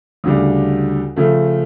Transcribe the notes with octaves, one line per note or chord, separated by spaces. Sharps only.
D2 C#3 G3 D4
C#3 F3 A3